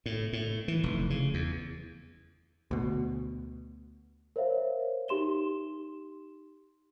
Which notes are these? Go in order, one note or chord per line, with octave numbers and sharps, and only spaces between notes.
A2
A2
E3
F1
C#3
E2
D2 B2
A#4 C5 C#5 E5 F5
D#4 G4 C6 E7 G7